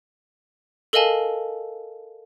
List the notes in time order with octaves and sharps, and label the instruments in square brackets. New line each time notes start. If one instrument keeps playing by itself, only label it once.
[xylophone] A4 A#4 D#5 F5 G#5 A5